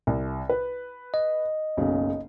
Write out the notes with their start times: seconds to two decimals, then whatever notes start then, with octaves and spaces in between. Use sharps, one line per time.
0.07 C2
0.49 B4
1.14 D#5
1.77 F#1 B1 C#3